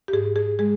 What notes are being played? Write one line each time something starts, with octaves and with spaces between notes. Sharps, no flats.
G4
G#2 G#4
G#4
G#3 G#4